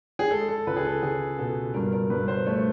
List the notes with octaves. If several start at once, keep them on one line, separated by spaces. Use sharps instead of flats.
G#4
G#3 A4
A4
C#2 B4
G#4
A4
C#2 G#4
B2 A4
G2 A#4
A#4
G2 B4
C5
A3 C#5